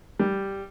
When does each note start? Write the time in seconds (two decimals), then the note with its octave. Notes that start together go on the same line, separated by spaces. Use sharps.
0.19 G3